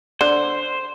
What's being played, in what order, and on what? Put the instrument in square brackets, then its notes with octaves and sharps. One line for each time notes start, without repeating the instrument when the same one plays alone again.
[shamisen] D3 [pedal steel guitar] C5